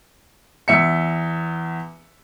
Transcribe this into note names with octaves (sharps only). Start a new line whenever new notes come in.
E2 E5 C#7